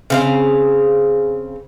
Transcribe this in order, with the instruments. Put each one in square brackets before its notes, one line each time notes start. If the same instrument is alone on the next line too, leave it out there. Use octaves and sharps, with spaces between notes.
[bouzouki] C#3 C4 F5